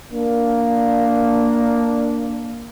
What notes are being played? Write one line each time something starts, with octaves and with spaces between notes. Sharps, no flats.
A#3 D4